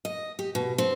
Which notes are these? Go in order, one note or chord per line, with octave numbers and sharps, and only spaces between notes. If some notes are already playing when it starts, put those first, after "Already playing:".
D#5
G4
B2
C4